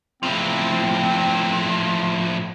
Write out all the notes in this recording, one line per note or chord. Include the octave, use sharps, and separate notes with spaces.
A2 F3 C4